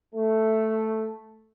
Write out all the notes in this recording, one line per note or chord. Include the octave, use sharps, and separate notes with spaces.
A3